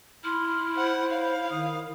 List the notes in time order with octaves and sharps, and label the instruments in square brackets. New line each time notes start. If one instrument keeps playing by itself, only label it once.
[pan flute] E4 [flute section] B5 C6 F6
[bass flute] C5 [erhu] F#5
[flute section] C#5 [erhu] F5
[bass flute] D#3 [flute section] D#6